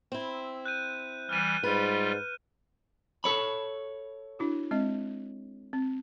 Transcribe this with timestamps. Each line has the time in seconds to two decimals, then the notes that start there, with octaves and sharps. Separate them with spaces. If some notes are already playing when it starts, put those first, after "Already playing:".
0.12 C4 E4
0.66 F#6 G6 D#7
1.29 E3 G3 F6 D#7
1.63 G#2 G3 F4 B4
3.24 A4 C#5 B5
4.39 D4 E4 F#4
4.71 G#3 C4 D#5
5.73 C4